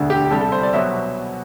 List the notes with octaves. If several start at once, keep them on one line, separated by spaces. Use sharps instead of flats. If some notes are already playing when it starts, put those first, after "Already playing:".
Already playing: E1 D2 D3
G4
C2 C3 G3 A4
A4
C5
D5
B2 F#3 E5